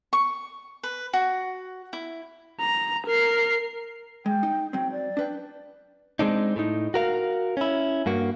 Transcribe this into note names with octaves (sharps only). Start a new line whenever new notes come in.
C#6
B4
F#4
E4
A#5
A#4 C7
G#3 G5
D#4
F#3 C4 G5
D5
D4 B4 G5
G#3 C4 D4 D#4
A2 D#4
F#4 A#4 F5
C#4 E4
G2 A#3 F#4